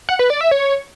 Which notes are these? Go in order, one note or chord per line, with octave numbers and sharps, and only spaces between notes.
F#5
B4
D5
E5
C#5